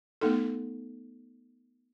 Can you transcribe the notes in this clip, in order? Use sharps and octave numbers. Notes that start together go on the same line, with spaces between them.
A3 B3 D#4 A4